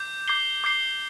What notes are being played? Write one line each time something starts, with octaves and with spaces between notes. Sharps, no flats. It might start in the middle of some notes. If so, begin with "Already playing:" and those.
Already playing: D6 G6
D6 G6 C7 G7
D6 G6 C7 G7